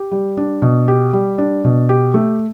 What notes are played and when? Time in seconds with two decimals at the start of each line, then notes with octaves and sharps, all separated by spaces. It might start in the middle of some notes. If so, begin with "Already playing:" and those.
Already playing: G4
0.11 G3
0.37 D4
0.62 B2
0.88 G4
1.13 G3
1.38 D4
1.64 B2
1.89 G4
2.14 A3